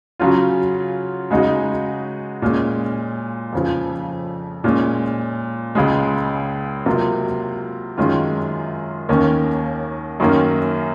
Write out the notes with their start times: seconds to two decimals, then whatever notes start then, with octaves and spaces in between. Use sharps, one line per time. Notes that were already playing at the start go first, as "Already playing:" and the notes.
0.19 C#3 F#3 C#4 F4
1.31 C#3 G#3 D#4 F#4
2.42 A#2 G#3 C#4
3.53 F2 C#3 F3
4.64 A#2 G#3 C#4
5.75 C#2 C#3 G#3
6.86 C3 F#3 A#3 F4
7.97 F#2 D#3 G#3 C#4 F4
9.09 D#2 D#3 A#3 C#4
10.20 F#2 D#3 A#3 C#4